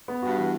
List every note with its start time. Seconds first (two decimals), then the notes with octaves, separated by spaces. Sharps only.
0.08 B3
0.23 G2 F#4
0.38 E3